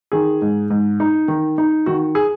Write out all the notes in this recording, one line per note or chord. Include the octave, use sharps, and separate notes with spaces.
D#3 G#4
G#2
G#2
D#4
D#3
D#4
D#3 F#4
G#4